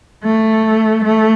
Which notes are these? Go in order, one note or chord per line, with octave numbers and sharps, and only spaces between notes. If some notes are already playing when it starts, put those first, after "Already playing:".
A3
A3